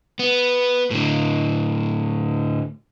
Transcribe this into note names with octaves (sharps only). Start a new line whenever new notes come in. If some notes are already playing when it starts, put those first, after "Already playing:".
B3
A2 D3